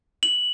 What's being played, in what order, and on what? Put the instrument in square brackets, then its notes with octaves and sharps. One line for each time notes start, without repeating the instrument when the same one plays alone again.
[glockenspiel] F#7